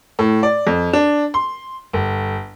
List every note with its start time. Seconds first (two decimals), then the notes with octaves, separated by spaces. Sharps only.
0.19 A2
0.43 D5
0.67 F2
0.93 D4
1.34 C6
1.93 G1